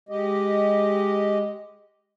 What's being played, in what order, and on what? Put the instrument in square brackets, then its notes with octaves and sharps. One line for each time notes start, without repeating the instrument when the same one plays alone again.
[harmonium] G#3 G4 D#5